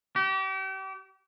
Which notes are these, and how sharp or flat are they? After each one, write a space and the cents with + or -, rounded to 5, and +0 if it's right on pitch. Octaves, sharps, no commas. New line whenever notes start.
G4 -35